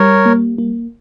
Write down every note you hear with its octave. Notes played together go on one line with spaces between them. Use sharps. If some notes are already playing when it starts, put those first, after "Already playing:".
Already playing: G3 A#4 C#5
A#3
A#3